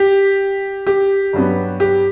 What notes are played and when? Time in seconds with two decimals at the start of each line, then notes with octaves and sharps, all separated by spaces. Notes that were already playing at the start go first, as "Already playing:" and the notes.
Already playing: G4
0.87 G4
1.33 G2 F#3 B3
1.80 G4